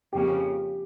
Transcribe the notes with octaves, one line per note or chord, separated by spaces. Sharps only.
F2 C#3 F3 A#3 C#4 G4